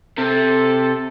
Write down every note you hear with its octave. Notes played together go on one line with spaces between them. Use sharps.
C3 A4